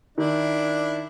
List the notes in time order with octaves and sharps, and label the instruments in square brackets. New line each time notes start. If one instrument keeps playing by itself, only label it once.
[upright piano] D#3 [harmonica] D4 E4